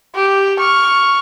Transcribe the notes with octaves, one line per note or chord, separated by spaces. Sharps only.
G4
C#6 F6